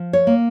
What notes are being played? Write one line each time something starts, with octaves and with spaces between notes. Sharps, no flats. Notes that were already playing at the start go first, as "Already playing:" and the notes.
Already playing: F3
C#5
A#3